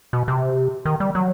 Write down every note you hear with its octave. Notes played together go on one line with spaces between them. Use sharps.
B2
C3
D#3
G3
F#3